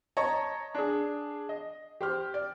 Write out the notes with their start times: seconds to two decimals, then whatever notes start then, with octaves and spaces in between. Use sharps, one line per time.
0.17 C#5 D#5 A5 A#5
0.75 D4 G#4
1.49 D#5
2.01 G4 C5 F6
2.34 D5